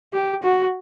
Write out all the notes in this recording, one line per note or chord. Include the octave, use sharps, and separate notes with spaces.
G4
F#4